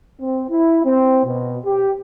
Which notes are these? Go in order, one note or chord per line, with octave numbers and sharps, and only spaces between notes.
C4
E4
C4
B2
G4